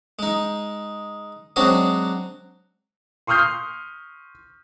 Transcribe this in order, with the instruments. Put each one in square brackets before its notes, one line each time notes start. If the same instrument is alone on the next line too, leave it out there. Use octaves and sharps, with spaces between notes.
[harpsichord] G#3 D#4
F#3 G#3 C4 D4 F#4 G#4
[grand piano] C6 C#6 D#6 F6 G6 C7